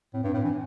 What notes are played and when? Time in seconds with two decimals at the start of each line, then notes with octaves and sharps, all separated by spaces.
0.14 A2 C4
0.23 G2 D4
0.33 A2 C4
0.43 E3 D4